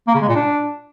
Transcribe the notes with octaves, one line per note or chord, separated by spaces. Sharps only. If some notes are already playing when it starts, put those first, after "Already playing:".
A#3
C#3
G#3
A#2
D4